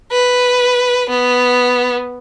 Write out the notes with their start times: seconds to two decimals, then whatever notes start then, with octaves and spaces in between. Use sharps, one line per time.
0.11 B4
1.09 B3